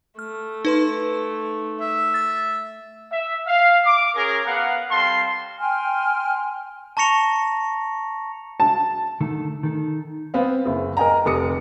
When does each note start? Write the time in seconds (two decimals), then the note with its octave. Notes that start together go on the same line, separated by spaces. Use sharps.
0.19 A3 F6
0.65 D#4 B4 C6
1.80 E5
2.14 E6 A6
3.12 E5
3.46 F5
3.85 D6
4.15 C#4 G#4 A#4
4.46 B3 A#4 F5 F#5
4.91 G3 C4 A4 F5 C6
5.60 G5 G#5 C6 F6
6.97 A5 A#5 C#6 A#6 C#7 F7
8.60 A5
9.20 D3 D#3 A3 A4
9.63 D#3 A4
10.34 B3 C4 F5
10.65 F#1 E4 G#4
10.97 A#4 D#5 G5 G#5 A#5
11.25 F1 A4 D6 D#6 C#7